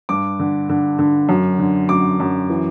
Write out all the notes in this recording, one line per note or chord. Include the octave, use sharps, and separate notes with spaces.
G2 D6
D3
D3
D3
F#2
D3
F#2 D6
F#2
E3